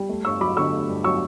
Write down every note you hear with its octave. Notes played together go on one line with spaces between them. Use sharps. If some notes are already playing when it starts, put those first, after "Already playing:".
Already playing: G3
A3
G2 C#6 E6
F#3 B5 D6
D3 C#6 E6
A3
G2
F#3 C#6 E6